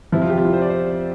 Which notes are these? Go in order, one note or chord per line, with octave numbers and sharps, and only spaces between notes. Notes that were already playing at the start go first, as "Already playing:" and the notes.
F2 C3 F3 E4
F4
G4
F4
E4
C5
D5
C5